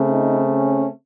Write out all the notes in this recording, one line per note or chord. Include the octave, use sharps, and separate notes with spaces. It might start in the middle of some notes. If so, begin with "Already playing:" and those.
Already playing: C#3 A3 C4
D#4
C#4